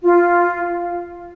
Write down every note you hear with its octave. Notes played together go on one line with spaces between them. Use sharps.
F4